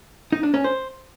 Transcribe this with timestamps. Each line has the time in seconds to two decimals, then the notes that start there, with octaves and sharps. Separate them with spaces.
0.32 D#4
0.43 D4
0.54 C#4
0.64 C5